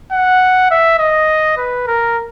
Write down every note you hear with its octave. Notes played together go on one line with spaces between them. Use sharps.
F#5
E5
D#5
B4
A#4